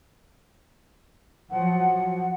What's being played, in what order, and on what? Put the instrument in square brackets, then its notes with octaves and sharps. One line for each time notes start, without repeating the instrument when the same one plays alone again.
[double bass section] F3 F#3 [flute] F#5